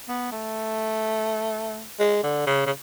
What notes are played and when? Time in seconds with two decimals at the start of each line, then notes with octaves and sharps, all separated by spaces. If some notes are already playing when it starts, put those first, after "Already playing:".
0.08 B3
0.32 A3
1.99 G#3
2.23 D3
2.46 C#3
2.66 C#3